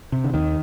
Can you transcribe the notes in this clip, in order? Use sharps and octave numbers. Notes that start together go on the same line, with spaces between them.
C3
D3
D#2 D#3